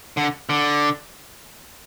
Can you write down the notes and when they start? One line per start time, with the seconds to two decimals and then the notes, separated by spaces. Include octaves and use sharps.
0.17 D3
0.49 D3